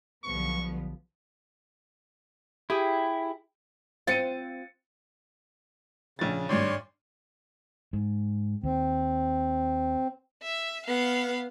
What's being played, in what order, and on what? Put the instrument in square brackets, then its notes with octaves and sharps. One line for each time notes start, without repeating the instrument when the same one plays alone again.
[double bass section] B1 D3 [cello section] F3 G3 B3 [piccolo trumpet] C#6
[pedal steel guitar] E4 [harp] G4 G#4
[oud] C4 F4 [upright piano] A6 C#7 D#7
[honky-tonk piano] A#1 A6 [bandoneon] C#3
[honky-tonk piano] G#1 G2 [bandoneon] C#5 D5 C6
[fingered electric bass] G#2
[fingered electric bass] D#2 [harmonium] C4
[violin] E5
B3 F5